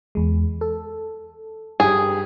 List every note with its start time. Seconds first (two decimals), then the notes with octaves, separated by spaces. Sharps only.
0.15 E2 G#3
0.61 A4
1.80 G2 G4 G#4